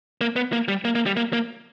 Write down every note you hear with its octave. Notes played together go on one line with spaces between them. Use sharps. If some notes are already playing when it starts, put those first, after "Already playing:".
A#3
B3
A#3
G3
A#3
A#3
G3
A#3
A#3